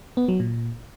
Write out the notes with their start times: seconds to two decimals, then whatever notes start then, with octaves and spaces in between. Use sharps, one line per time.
0.17 B3
0.28 F#3
0.40 A#2